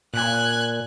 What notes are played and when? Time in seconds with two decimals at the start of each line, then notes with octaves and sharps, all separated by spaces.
0.14 A#2 G#5 F#6